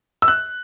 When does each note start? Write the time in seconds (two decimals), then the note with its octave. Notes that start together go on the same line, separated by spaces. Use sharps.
0.22 E6
0.28 F#6